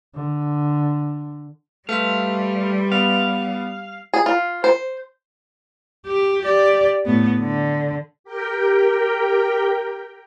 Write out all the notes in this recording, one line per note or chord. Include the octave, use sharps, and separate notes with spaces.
D3
G3 A3 B4 E5 F5 C6
B3 F5
G#4
F4
C5
G4
G4 D5
A2 B3
D3
G4 A#4 G5